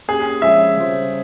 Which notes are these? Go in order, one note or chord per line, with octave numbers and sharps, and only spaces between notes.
A#3 C#4 G4 G#4
F3 G#3 C#4 F4 G#4 E5
C#3 G3 C#4 F4 C5